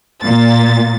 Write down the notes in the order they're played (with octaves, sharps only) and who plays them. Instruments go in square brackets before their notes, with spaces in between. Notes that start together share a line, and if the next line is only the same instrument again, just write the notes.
[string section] A#2 A6